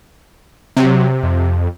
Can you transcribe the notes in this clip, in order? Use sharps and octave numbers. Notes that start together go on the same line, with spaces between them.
C3 F#3
F2